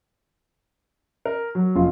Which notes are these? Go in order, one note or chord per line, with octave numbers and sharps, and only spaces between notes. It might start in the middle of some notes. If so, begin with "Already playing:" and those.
A#4
F#3
F1 F4